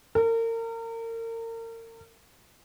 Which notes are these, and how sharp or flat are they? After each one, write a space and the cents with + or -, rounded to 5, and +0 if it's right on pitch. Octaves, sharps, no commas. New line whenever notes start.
A#4 -35